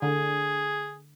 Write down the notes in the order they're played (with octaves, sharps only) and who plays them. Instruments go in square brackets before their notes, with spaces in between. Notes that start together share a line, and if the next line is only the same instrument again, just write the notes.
[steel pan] D3 [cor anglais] G#4